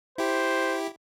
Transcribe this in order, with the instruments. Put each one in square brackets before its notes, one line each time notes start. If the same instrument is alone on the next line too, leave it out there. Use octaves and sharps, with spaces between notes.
[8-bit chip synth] E4 G4 [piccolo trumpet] C5